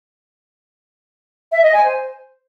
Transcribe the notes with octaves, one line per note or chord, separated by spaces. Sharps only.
E5
D#5
G#5
C5